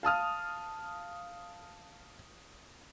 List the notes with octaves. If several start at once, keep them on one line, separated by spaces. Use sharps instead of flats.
F5 A5 D#6 F6